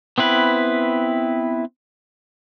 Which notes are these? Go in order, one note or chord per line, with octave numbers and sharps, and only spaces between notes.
B3 C4 E4 B4